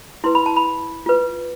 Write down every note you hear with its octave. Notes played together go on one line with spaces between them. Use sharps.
E4 B4 C6
B5
A5
B5
F4 B4